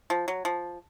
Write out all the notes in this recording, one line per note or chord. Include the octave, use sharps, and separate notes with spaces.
F3
F#3
F3